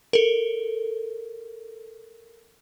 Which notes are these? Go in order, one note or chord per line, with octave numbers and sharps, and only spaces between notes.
A4 A#4